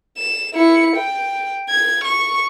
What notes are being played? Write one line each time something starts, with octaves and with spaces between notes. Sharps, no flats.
E7
E4 C#7
G5
G#6
C#6